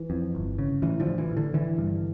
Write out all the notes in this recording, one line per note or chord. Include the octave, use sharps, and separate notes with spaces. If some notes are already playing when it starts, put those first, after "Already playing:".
Already playing: E3
F2
G1
C#3
A1 E3
D3 F3
A1
E3
A1
D3
D3 E3
G2